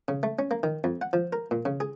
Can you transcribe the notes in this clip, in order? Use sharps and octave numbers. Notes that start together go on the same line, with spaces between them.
C#3
A3
C#4
A#3
D#3
F2
F#5
F3
A#4
A#2
C#3
G#4